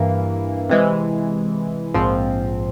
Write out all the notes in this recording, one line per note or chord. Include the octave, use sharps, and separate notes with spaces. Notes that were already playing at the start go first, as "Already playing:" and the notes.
Already playing: G2 E3 A#3
C3 E3 G#3
A#1 G#2 F3 C4